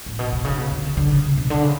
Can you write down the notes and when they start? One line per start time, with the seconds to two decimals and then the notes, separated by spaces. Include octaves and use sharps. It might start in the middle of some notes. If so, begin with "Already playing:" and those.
0.06 A2
0.19 B2
0.33 B2
0.45 C#3
0.58 B2
0.72 D3
0.85 C#3
0.97 D3
1.11 C#3
1.24 C#3
1.37 B2
1.50 D3
1.63 C#3